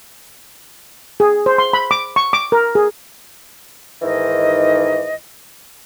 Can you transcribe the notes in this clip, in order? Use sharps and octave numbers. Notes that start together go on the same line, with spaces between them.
G#4
C5
C6
B5
D6
C#6
D6
A#4
G#4
G#2 D#3 E3 D#5